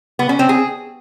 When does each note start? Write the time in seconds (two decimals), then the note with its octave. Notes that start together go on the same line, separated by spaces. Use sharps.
0.19 B3
0.29 C#4
0.39 C4
0.49 G#4